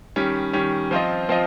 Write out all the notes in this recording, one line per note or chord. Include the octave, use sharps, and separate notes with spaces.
D#3 G3 C#4
D#3 G3 C#4
F3 C4 F4 C5 D#5
F3 C4 F4 C5 D#5